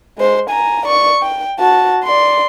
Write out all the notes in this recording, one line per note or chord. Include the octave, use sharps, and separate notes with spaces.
G#3 C5
G#5 A#5
D5 C#6
G5
F#4 A5
D5 C6